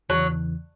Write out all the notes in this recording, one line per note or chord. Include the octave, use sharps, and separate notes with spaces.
E2 C#3 E3 F#3